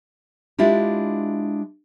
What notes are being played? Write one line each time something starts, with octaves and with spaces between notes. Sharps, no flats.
G#3 D4 E4 F4 G4